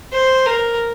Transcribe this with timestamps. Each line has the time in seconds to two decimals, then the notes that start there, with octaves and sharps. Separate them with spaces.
0.13 C5
0.46 A#4